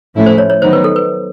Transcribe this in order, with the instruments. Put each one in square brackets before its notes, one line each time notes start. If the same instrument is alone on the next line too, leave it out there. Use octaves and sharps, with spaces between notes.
[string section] A2 F3 A3 C#4 E4
[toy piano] C5
C#5
C#5
[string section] D#3 F#3 B3 D#4 [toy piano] C5
[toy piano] B4
A4
B4